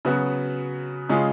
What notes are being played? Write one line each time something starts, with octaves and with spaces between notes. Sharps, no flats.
C#3 F#3 B3 F#4
C#3 G#3 C#4 F4 G#4